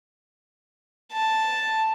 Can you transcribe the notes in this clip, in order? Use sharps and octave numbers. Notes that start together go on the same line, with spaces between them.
A5